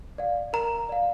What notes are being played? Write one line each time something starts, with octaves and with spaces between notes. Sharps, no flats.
D5 F5
A#4 A#5
D5 F5